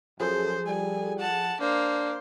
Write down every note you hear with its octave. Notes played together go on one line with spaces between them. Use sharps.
F#2 F3 G#4 A4 C5
G3 G#5
F#5 A5
A#3 D4 C5